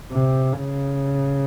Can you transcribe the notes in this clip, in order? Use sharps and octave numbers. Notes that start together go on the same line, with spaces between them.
C3
C#3